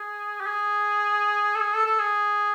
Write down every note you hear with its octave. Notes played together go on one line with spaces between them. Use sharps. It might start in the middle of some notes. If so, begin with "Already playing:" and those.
Already playing: G#4
G4
G#4
A4
G#4
A4
A4
G#4